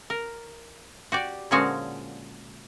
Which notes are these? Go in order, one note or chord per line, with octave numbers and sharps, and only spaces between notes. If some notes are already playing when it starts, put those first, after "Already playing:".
A#4
F#4 G4 D5
A#2 D3 F3 G#3 C#4 F#4